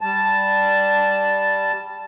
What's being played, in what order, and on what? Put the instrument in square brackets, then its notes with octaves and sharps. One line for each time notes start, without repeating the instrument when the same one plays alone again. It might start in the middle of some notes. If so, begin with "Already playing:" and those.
[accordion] G3 A5